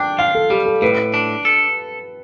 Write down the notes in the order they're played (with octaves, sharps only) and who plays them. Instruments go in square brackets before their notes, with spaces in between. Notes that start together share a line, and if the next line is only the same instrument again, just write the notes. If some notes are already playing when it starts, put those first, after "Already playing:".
Already playing: [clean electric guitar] D4 [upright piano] G5
[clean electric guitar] F4 [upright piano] F5
[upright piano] A4
[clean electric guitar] G3 [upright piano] G4
[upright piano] A4
[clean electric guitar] A2 [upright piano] B4
[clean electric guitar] D4
A4